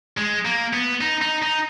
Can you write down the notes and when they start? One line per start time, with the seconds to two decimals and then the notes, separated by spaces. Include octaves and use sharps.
0.17 G#3
0.45 A#3
0.73 B3
1.01 D#4
1.22 D#4
1.43 D#4